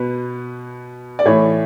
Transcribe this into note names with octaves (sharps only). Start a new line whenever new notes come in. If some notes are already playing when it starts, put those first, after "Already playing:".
Already playing: B2 B4
D5
A2 E3 C#5